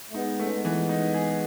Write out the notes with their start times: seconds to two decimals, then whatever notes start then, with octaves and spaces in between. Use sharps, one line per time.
0.10 A3
0.14 G#3 B3 D#4
0.40 A3 C#4
0.51 G#3 B3
0.65 E3
0.89 D#4
1.14 G#4